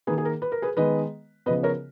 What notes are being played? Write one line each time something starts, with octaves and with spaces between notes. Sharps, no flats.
D#3 A#3 G#4 B4
G#4
A#4
B4
A#4
G#4 B4
D#3 G#3 B3 B4 D#5
C#3 F3 B3 B4 D#5
A#4 C#5